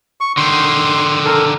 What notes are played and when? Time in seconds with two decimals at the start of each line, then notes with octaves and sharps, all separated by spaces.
0.21 C#6
0.37 D3 D#3 C6
1.26 A4 A#4